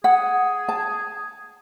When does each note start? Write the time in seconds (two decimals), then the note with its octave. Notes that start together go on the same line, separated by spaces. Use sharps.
0.04 G#4 F#5
0.69 A5